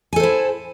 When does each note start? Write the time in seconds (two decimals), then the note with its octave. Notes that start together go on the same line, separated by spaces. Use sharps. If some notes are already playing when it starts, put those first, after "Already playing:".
0.13 G#5
0.16 A4
0.20 C5
0.23 E4